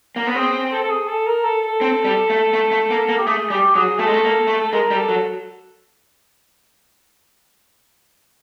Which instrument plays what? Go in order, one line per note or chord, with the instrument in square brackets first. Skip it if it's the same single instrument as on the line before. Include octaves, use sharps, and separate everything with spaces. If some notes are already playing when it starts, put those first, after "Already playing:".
[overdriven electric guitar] A#3
B3
[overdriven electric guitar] C4 [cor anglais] G#4
[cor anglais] A4
A4
G#4
A4
A#4
A4
A4
[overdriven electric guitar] C4
G3
A3
A3
A3
A#3
A#3
[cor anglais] G4
[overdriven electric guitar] A3 [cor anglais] G#4
[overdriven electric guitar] G3 [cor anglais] G4
[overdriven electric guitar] F#3 [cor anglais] G#4
[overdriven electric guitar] A3 [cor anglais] A4
[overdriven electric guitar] G#3
A3
A#3
A3
[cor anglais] A4
[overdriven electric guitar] G#3 [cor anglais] A#4
[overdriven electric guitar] G3
[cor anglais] A4
[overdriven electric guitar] F#3